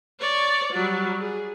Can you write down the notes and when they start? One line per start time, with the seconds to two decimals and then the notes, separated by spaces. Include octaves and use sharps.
0.21 C#5 D5
0.73 F#3 G3
1.20 G#4